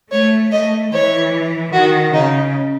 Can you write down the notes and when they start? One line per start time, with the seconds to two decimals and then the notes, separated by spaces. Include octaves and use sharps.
0.12 A3 C#5
0.52 A3 D#5
0.92 E3 C#5
1.73 D#3 F#4
2.13 C#3 D#4